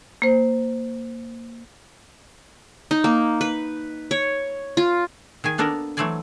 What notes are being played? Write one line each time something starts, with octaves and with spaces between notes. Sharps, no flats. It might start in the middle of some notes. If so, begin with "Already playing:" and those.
A#3 C5
D#4
A#3
B4
C#5
F4
D#3 G#4 G#5
A#3 B3 D4 A4 A#4 D5
E3 F#3 A3 C5 D5 G#5